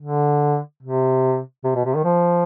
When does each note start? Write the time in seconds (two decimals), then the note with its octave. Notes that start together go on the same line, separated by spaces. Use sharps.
0.02 D3
0.83 C3
1.64 C3
1.75 B2
1.86 C3
1.95 D#3
2.05 F3